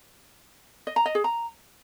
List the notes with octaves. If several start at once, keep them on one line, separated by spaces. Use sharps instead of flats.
D#5
A#5
D#5
G#4
A#5